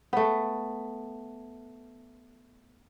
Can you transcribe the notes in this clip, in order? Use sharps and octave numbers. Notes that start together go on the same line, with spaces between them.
A3 B3